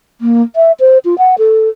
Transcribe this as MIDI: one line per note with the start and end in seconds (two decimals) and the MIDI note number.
0.21 0.42 58
0.56 0.72 76
0.80 0.98 72
1.05 1.18 65
1.18 1.35 78
1.38 1.69 69